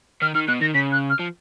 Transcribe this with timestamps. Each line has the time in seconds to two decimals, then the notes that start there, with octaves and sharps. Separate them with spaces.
0.22 D#3 F6
0.35 D#3 F6
0.48 B2 F#6
0.61 D#3 A#6
0.74 C#3 B6
0.92 F#6
1.10 F6
1.19 F3